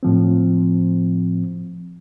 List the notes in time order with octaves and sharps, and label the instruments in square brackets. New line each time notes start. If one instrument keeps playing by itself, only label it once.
[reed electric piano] A2 F3 C4